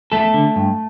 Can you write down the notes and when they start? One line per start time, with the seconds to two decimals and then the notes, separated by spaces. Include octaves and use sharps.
0.12 E2 A3 A4
0.34 D3
0.56 G2